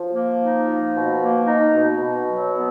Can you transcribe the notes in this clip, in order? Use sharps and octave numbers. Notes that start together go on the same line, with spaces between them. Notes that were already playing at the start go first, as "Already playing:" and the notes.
Already playing: F3
A#3
D#4
F3
B2
A#3
D#4
B2
B2
F#3
B3